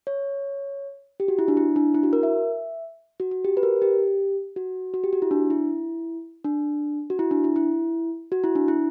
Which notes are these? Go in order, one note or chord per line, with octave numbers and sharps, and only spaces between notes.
C#5
G4
F#4
E4
D4
E4
D4
E4
F#4
A#4
E5
F#4
F#4
G4
B4
A#4
G4
F#4
F#4
G4
F#4
E4
D4
E4
D4
F#4
E4
D4
E4
E4
F#4
E4
D4
E4